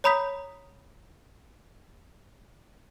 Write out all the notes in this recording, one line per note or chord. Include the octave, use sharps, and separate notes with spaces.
C#5 A#5 B5 D#6 G6 B6